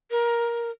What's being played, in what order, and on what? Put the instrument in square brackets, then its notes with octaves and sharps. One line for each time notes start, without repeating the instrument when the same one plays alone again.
[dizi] A#4